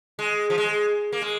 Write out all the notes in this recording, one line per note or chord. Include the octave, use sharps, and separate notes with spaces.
G#3
F3
G#3
A#3
G#3